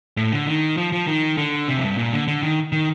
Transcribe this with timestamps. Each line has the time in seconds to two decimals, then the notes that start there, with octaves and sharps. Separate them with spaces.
0.17 A2
0.32 D3
0.47 D#3
0.77 F3
0.92 F3
1.07 D#3
1.37 D3
1.68 C3
1.77 F2
1.83 G2
1.97 A#2
2.13 D3
2.28 D3
2.43 D#3
2.72 D#3